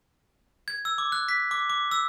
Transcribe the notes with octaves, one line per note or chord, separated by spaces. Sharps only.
G#6
E6
D6
F#6
B6
D6
D6
E6